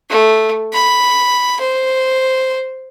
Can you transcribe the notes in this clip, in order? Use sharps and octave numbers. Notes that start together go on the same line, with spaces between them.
A3
B5
C5